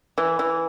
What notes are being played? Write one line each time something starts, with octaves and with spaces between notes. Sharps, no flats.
E3
E3